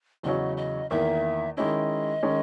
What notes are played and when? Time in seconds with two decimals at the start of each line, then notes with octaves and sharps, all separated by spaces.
0.23 E2 C#3 F#3 C#4 D#5
0.57 D#5
0.90 E2 D#3 A#3 E5
1.57 D#3 G#3 C#4 E4 D#5
2.23 D#3 G#3 C#4